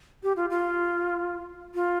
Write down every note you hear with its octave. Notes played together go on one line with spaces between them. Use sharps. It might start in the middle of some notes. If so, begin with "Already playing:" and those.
G4
F4
F4
F4